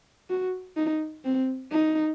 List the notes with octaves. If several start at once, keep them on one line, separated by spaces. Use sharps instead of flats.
F#4
D#4
C4
D#4